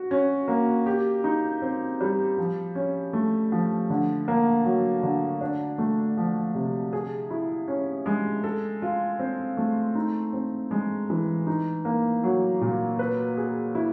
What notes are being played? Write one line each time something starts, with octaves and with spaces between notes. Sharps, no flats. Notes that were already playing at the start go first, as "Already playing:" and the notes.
Already playing: F#4
C#4
A#3
G4
D#4
C4
G3
F3
C#4
A3
F3
D3
A#3
F#3
D3
D4
A3
F3
C3
G#4
E4
C#4
G#3
A4
F4
C4
A3
D#4
C4
G#3
E3
D#4
A#3
F#3
A#2
B4
G#4
E4